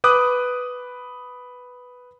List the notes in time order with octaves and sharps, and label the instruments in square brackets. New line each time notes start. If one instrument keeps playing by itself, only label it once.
[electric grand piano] B4 D6 D#6 F#6